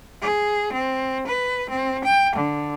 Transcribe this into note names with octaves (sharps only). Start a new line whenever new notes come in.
G#4
C4
B4
C4
G5
D3